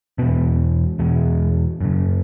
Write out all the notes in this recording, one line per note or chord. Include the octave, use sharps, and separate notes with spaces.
E2 B2 B3
E2 B2 G#3
F#2 C#3